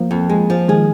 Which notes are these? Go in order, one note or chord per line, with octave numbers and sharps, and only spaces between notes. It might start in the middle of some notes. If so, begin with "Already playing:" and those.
Already playing: F3 A#3
F2
G#3
F3
D#3 G#3 G#4